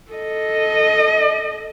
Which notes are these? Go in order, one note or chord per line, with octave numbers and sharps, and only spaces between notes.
A4 D#5